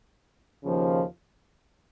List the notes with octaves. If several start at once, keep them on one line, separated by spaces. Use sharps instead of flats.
D#2 C#3 F3